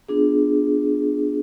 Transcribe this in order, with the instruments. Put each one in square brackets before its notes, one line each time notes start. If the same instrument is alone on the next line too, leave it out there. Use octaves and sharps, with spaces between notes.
[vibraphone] B3 D4 F4 G#4